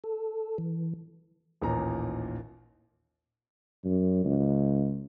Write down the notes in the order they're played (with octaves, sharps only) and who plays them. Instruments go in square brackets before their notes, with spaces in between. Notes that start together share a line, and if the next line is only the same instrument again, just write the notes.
[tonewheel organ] A4
E3
[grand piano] A1 D#2 A#2 D#4 A#5
[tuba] F#2
C#2